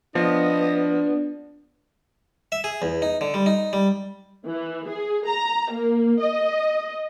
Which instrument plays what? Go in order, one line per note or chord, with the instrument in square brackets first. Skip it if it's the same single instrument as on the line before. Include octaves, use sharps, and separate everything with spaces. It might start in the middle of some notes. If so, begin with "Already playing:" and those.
[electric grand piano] F3 [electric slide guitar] B3 [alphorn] D4 [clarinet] D#5
[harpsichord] E5
G#4
E2
D#4
D3
G3
D#4
G3
[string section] E3
G#4
A#5
A#3
D#5